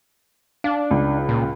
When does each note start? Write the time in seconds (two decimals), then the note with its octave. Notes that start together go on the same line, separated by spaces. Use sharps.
0.64 D4 F5
0.91 C#2
1.29 A#2